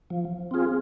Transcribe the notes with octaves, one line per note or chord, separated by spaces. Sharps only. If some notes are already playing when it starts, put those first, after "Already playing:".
F3
C4 F4 G#4